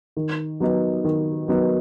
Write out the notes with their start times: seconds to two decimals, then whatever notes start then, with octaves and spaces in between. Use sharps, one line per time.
0.17 D#3
0.60 F#3 B3 D#4
1.04 D#3
1.48 F#3 B3 D#4